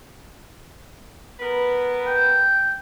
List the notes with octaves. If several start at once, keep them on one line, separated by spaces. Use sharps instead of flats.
B3 A#4 B4
G5